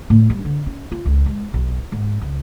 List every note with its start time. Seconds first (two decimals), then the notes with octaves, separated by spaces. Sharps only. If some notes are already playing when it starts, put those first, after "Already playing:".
0.10 A2
0.30 G3
0.45 D3
0.66 C#4
0.92 F4
1.06 C#2
1.26 G#3
1.54 B1
1.92 G#2
2.22 C#2